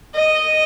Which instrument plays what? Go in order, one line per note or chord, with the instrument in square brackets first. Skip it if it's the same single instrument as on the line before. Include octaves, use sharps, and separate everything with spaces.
[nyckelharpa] D#5